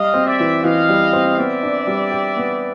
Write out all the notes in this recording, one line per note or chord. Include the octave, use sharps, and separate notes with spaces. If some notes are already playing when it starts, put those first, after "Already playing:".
Already playing: G3 D#5 F5
C4
D5 E5
E3
E3 D#5 F5
G3
C4
B3 D5 E5
D4
G3
G4
B3